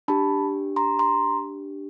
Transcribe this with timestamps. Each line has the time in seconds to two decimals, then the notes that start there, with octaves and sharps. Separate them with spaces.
0.08 D4 G4 A5 B5
0.76 A#5 C6
0.99 A#5 C6